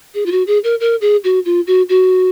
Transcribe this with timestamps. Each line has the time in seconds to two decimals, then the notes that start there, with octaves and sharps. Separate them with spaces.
0.14 G#4
0.26 F4
0.32 F#4
0.47 G#4
0.64 A#4
0.80 A#4
1.01 G#4
1.24 F#4
1.45 F4
1.67 F#4
1.89 F#4